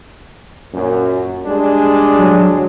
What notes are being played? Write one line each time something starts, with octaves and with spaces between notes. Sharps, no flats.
F#2 A#2
G3 G#3 D4
F#3